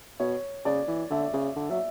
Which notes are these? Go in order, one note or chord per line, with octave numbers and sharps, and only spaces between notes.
B2 C#5
C#3 D5
E3
D3 E5
C#3
D3
F#3 E5